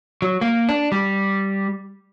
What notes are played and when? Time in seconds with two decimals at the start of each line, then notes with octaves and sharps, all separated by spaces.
0.22 F#3
0.41 A#3
0.69 D4
0.92 G3